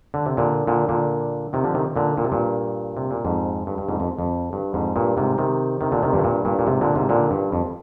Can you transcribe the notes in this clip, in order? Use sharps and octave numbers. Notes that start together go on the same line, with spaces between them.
D3
C3
A#2 D3
A#2 D3
A#2 D3
C3 D#3
D3 F3
C3 D#3
A#2 D3
A#2
C3
G2 A#2
C3
A#2
F2 G#2
G2
G2
F2 G#2
F2
F2
G2
F2 G#2
G2 A#2
G#2 C3
C3 D#3
C3 D#3
A#2 D3
C3 D#3
G2 A#2
C3
G2 A#2
G2 A#2
A#2
G#2 C3
A#2 D3
G#2 C3
A#2 D3
G2
F2